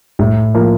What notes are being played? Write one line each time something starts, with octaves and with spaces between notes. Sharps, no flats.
A2
F3 A#3